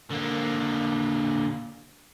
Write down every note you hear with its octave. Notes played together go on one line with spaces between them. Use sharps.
D3 A#3